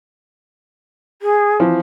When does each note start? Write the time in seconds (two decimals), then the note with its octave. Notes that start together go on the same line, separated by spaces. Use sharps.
1.22 G#4
1.60 E3 F3 C4